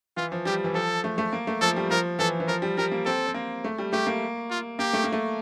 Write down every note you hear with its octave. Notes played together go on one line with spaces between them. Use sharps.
E3 F4
F3
G3 G4
E3
F3 A4
A3
A3
A#3
A3
F3 A4
G3
F3 A#4
E3 A4
E3
F3 A#4
G3
G3 A#4
A#3
C4 A4
C4
A#3
A3
G3
A3 G4
A#3
F4
A#3 G4
A3
A#3
A3